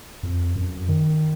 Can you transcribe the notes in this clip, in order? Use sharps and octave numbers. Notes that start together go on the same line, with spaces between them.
F2
F#2
D#3